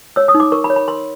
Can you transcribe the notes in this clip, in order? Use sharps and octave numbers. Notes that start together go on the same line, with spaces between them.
C#5 E6
D#6
D#4
D6
A#4 C#6
B5
C#5
B5
A#4 C6